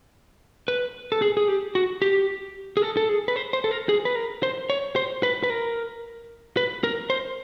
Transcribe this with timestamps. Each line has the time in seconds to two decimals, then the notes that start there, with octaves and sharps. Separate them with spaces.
0.68 B4
1.12 A4
1.22 G#4
1.37 G#4
1.48 G4
1.75 F#4
2.02 G4
2.77 G#4
2.82 A4
2.97 A4
3.09 G#4
3.28 B4
3.36 C5
3.53 C5
3.64 A4
3.71 A#4
3.89 G#4
4.05 B4
4.15 A#4
4.43 C5
4.70 C#5
4.96 C5
5.23 B4
5.43 B4
5.50 A#4
6.57 B4
6.84 A#4
7.10 C5